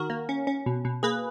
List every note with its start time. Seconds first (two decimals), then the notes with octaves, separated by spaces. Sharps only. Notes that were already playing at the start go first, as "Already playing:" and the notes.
Already playing: D#3 F#4 A#4
0.10 A#3
0.29 C#4
0.47 C#4
0.66 B2
0.85 B2
1.03 A#3 G#4 B4